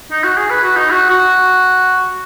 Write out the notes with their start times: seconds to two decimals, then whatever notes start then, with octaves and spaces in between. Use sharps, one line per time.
0.11 D#4
0.24 F#4
0.37 G#4
0.50 B4
0.63 F#4
0.76 D#4
0.90 F#4
1.10 F#4